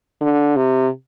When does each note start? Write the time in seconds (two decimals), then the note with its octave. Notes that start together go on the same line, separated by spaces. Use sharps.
0.21 D3
0.56 C3